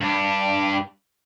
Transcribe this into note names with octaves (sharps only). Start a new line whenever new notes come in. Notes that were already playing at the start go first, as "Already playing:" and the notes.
G2 D4